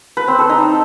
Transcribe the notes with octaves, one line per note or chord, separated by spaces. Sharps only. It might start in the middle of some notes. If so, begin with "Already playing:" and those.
B4
C4
A4
D#4